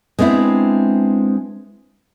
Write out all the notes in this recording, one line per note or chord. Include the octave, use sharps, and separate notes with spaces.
G#3 B3 C4 D4 E4